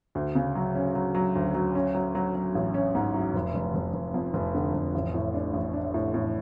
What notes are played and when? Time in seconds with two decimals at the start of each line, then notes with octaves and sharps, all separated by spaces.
0.15 D2
0.35 C#3
0.55 F#3
0.75 C#4
0.95 F#3
1.15 F#3
1.35 D2
1.55 F#3
1.75 C#4
1.95 F#3
2.15 F#3
2.35 F#3
2.55 A1
2.74 C#4
2.95 G#2
3.14 F#3
3.34 F1
3.54 F1
3.75 F1
3.94 F1
4.14 F2
4.34 F1
4.54 D3
4.74 F1
4.94 A1
5.14 A2
5.34 D4
5.53 A1
5.73 D4
5.94 A2
6.14 A2